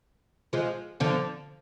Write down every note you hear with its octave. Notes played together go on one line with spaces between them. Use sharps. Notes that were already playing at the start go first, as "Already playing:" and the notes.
F3 G#3
D3 F3